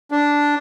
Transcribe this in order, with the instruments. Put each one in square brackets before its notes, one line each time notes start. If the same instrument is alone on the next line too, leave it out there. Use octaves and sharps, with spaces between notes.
[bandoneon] D4